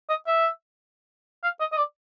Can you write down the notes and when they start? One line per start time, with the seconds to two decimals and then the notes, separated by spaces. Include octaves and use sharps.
0.09 D#5
0.27 E5
1.43 F5
1.60 D#5
1.72 D#5
1.77 D5